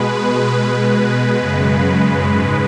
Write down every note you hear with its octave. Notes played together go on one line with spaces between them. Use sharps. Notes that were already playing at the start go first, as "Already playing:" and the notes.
Already playing: B2 G#3 B4
B2 G#3
F#2 C#3 G#3
G#2 G#3